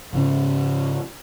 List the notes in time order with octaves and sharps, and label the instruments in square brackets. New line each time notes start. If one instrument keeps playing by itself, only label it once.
[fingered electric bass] G#2 C#3 C#4